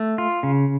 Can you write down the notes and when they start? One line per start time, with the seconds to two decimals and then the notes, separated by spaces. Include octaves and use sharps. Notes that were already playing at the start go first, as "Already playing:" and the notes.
Already playing: A3
0.18 F4
0.43 C#3